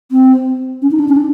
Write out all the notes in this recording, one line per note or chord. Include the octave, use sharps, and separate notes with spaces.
C4
C#4
D#4
D4
C#4
D4